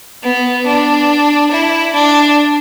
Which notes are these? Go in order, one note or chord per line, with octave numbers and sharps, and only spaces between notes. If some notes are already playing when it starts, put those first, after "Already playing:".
B3
D4
E4
D4